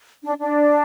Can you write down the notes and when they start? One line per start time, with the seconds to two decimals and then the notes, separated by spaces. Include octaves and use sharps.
0.24 D4
0.40 D4